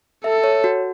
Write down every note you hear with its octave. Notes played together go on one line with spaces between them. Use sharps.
A4 E5
C#5
F#4